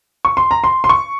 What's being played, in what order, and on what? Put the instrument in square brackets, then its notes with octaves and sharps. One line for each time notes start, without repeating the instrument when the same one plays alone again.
[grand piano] C#6
C6
A#5
C6
C6
C#6